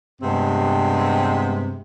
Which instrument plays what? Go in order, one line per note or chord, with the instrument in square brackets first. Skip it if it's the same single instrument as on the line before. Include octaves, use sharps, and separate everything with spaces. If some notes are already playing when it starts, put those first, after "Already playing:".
[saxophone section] G2 C3 G#3 B3 C4